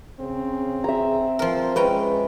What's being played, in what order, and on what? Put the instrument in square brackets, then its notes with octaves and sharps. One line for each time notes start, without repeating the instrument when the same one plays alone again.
[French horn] C#3 [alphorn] C4
[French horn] G#4 [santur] E5 A#5
[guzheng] F3 A#4 [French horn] C5
[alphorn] G#3 [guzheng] C#4 G5 A#5 [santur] B4